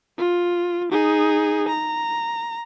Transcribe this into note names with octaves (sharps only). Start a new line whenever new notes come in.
F4
D#4 G#4
A#5